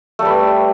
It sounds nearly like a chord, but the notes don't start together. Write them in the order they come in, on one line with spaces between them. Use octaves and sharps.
A3 G3 B4